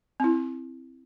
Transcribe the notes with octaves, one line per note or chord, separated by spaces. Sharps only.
C4 E4